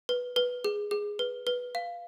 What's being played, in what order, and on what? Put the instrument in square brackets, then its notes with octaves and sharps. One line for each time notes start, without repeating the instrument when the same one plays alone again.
[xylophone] B4
B4
G#4
G#4
B4
B4
F5